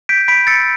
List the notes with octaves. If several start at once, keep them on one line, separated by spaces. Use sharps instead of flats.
G6 B6 D7
B5 B6 D7
E6 A6 C#7